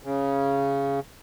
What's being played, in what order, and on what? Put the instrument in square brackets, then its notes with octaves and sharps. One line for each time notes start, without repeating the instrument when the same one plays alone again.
[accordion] C#3